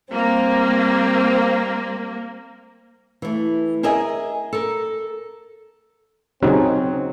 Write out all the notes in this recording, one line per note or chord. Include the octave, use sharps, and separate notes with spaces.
G3 A#3 C4
E3 A3
G#4 A#4 D#5 E5 G#5
A4 A#4
C#3 F#3 C4 C#4 D#4 G#4